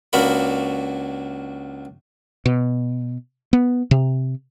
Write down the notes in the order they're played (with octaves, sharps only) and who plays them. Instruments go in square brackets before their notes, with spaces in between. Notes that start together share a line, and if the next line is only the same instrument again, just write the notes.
[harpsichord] C#2 A#3 D4 F#4 A#4 B5
[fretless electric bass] B2
B3
C3